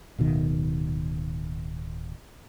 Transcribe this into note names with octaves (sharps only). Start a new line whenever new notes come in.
D1 B2 D#3